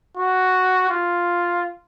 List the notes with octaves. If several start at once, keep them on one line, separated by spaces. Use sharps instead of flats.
F#4
F4